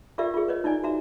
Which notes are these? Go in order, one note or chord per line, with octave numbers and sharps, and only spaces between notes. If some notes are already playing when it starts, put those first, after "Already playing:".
F4 G4 A#4 D5 E5
F4 G#4
B4 C#5 D#5
D#4 E4 D5 G#5
F#4 E5 A#5